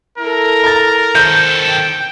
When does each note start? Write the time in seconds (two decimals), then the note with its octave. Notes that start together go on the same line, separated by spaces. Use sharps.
0.18 E4 A4 A#4
0.64 A#5 A6
1.15 D#3 A4 C5 G6
1.70 G5